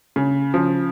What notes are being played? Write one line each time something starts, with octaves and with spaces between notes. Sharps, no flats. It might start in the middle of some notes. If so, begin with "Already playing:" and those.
C#3
C#3 F3